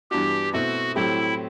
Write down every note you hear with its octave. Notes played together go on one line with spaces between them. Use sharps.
G2 E3 B3 D4 F#4 G4
B2 A3 C4 E4 F#4
A2 F#3 A3 C4 E4 G4